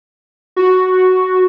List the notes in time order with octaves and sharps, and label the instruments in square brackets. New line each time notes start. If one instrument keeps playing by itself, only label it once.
[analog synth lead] F#4